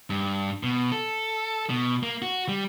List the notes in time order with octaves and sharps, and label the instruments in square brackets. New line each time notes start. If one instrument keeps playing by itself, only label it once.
[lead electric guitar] G2
B2
A4
B2
A#3
F#4
G3